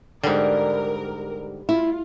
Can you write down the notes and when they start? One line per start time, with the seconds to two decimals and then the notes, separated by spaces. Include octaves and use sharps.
0.24 G#2 D3 G3 A#4
1.69 E4 F4